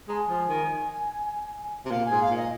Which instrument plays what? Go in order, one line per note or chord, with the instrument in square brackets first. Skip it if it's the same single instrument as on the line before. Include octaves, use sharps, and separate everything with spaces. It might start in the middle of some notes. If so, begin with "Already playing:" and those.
[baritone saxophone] G#3 [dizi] A#5
[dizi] G#5
[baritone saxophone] F3
D#3
C3
[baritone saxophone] A#2 [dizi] F5
[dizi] G#5
[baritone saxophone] G#2
[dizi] F5
[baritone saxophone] A#2
[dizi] D#5